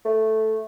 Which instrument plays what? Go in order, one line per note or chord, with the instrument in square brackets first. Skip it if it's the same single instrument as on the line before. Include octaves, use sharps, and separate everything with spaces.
[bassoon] A3